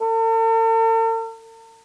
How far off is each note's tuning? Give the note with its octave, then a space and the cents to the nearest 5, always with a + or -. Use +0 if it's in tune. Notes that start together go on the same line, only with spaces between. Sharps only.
A4 +45